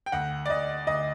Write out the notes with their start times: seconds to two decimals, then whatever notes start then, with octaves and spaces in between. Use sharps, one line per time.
0.06 G5
0.12 D2 F#5
0.46 D5
0.49 D2 D#5
0.87 D2 D#5